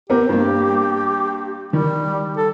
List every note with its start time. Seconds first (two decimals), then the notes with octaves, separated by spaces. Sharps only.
0.10 B3 C4 G4 A#4
0.29 G2 A#3
1.73 D#3 G3
2.37 A4